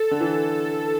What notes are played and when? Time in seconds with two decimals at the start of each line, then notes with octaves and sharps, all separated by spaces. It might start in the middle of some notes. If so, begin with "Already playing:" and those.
Already playing: A4
0.11 D3
0.21 E3